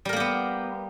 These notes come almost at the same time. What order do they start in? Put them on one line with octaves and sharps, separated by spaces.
G3 A#4 A#3 G4 B3